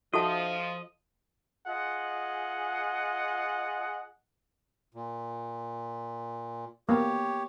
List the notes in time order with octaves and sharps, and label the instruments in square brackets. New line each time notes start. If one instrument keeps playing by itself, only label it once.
[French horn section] F3 [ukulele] D#4 E5 F#5 [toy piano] F#4 A4 A5 [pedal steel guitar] D#5
[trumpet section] F4 G#4 D#5 F#5
[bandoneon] A#2
[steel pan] A#3 B3 [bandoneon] G4 C#5